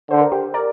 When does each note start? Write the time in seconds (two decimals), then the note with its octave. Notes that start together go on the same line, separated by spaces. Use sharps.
0.10 D3 C5
0.21 A#4
0.32 G4 C5
0.54 A#4 D5